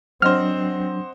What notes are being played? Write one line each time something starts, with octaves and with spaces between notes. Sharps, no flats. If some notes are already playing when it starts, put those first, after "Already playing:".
F#3 C4 D4 C5 D#5 F#5 F6